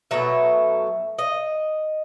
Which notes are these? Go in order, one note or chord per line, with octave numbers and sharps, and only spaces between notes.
B2 F#3 A3 E5
D#5